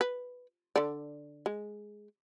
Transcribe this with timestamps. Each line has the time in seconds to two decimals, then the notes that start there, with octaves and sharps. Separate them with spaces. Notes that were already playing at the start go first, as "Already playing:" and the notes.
0.01 B4
0.76 D3 A4 D5
1.46 G#3